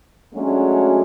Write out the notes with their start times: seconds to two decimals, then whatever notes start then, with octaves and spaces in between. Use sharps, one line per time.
0.34 F#3 G#3 A3 C#4 D4 F#4